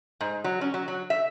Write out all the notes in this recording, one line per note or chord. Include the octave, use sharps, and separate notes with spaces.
G#2
F#3
C#4
F#3
F#3
E5